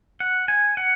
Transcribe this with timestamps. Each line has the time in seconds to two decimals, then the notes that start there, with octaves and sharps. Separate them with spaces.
0.20 F#5
0.48 G#5
0.77 F#5